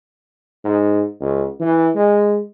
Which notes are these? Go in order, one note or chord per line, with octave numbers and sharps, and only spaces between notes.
G#2
C#2
E3
G#3